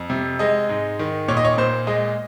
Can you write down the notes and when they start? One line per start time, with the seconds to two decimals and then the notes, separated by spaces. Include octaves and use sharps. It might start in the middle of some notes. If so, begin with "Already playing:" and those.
Already playing: F2
0.10 C3
0.39 G#3 D#5
0.69 G#2
0.99 D#3
1.28 A#2 C#5
1.37 D#5
1.45 C#5
1.58 A#2 C5
1.87 G#3 D#5